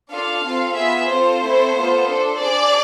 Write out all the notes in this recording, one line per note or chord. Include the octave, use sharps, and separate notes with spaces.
D4 F4 A4 F5
C4 F4 A4
B3 F4 G#4 E5
C4 F4 A4 C5
A3 C4 E4 A4
B3 F4 A4
D4 A4
D4 G#4 D5